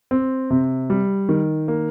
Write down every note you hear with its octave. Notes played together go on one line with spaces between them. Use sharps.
C4
C3
G3
D#3
A#3